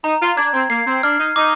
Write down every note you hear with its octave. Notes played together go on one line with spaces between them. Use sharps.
D#4 A#5
F4
D4 G#6
C4
A#3 C7
C4
D4 F6
D#4
D#4 D6